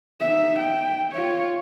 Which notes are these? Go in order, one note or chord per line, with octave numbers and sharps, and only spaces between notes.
D#4 E5
G5
F4 C#5